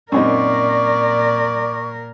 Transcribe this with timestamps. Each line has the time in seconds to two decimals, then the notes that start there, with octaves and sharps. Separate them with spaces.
0.12 F#2 A#2 C4 D#4 A#4 D5 C#6